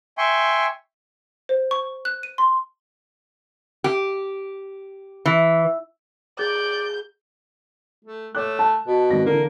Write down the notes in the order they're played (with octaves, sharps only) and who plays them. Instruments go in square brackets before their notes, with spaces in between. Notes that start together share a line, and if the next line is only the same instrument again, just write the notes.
[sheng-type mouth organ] E5 G5 G#5 C6 C#6
[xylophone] C5
C#6
F#6
D#7
C6
[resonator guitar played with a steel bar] G4
E3
[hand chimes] G#4 [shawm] D5 [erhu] G6
[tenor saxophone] A3
[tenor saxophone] A3 [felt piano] C#5 D6 F#6
[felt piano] A5
[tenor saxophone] B2
[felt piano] G#1 A#6
[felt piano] D3 E3 [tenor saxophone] A#3